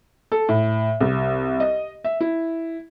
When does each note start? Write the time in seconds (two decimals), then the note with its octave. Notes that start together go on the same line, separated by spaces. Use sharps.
0.32 A4
0.49 A2
1.00 C2
1.60 D#5
2.04 E5
2.21 E4